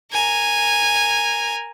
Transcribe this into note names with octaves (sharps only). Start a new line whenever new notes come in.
A#4 G#5